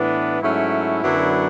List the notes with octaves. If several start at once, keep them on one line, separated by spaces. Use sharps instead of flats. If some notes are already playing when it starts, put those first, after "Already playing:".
Already playing: A2 E3 B3 D4
G#2 F#3 A3 C#4 E4
F#2 D3 F#3 B3 D4